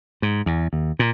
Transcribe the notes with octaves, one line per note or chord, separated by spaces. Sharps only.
G#2
E2
D#2
A#2